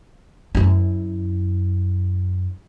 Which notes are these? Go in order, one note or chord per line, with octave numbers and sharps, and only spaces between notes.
F#2 E4